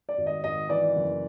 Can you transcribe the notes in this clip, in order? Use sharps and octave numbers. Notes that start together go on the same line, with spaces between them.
D5
G#1
D#5
G#1 D#5
E3 D5
F#1